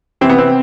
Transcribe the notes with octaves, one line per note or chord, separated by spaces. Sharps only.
C3 E3 C4
B3
C4